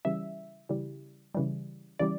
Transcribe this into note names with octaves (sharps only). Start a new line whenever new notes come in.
C#3 E3 G3 E5
C#3 E3 G3
C#3 E3 G3
C#3 E3 G3 D5